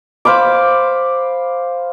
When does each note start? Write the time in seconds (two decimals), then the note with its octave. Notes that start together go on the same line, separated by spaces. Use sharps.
0.25 C5 F5 B5 D6